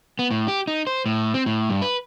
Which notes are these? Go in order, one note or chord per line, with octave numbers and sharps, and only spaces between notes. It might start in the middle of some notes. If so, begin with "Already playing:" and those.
B3
A2
G4
D#4
C5
A2
C4
A2
G2
B4